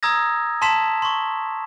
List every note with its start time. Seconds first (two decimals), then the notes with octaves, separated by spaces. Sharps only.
0.03 A#5 D#6 E6 G#6 A#6
0.62 A5 C6 B6 E7
1.02 C6 C#6